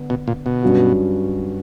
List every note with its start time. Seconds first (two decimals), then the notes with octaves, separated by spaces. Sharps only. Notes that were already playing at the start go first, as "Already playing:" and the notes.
Already playing: D3 B3 D4
0.10 B2
0.28 A#2
0.46 B2
0.62 G2 F#3 C#4 F#4